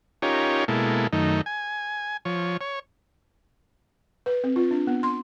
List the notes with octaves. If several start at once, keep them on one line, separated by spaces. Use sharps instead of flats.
C#4 D#4 F4 G4 A#4 C#5
B2 G#3 A#3 E4 A4
F#2 D#3 A3 D#4
G#5
F3 C#5
C#5
B4
C4
F4
D4
B3
C6